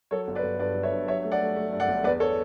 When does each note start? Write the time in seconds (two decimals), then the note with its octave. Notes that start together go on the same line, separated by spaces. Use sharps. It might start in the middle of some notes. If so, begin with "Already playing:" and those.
0.11 F#3 A4 C#5
0.28 G1
0.35 B4 D5
0.43 G1
0.59 G2 B4 D5
0.75 G1
0.83 C#5 E5
0.92 G2
1.07 F#3 C#5 E5
1.23 A3
1.32 D5 F#5
1.41 A3
1.56 A3
1.72 G2
1.80 D5 F#5
1.89 G1
2.04 E2 B4 D5
2.20 A4 C#5